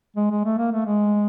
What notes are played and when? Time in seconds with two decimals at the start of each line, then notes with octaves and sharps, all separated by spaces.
0.17 G#3
0.31 G#3
0.45 A3
0.58 A#3
0.73 A3
0.86 G#3